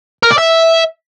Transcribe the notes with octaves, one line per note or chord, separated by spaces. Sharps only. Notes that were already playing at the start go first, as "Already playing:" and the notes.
A#4
D5
E5